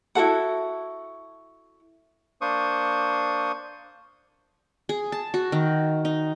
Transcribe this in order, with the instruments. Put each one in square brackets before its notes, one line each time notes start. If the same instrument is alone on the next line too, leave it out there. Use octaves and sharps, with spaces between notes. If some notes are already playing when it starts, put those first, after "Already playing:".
[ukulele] E4 F#4 A4 F#5
[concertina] A#3 D4 C5 C#6 D#6
[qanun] G#4
A5
F#4
D#3
D#4